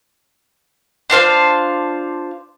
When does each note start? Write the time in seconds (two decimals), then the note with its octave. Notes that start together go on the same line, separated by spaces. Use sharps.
1.10 D4 F4 C5 F5